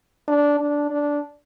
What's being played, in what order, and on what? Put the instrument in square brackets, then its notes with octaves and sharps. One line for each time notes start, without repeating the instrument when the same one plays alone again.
[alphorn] D4
D4
D4